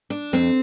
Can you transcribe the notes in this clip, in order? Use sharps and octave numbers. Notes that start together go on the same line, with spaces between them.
D4
F2 C4